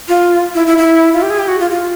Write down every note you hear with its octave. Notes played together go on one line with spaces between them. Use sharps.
F4
E4
E4
E4
F4
G4
G#4
G4
F#4
F4
F4